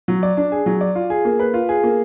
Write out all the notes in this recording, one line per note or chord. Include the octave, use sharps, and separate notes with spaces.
F#3
D5
D4
G#4
F#3
D5
F4
G#4
A#3
B4
F4
G#4
A#3